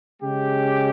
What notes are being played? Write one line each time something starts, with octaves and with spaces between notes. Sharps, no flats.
C#3 G#3 C#4 G4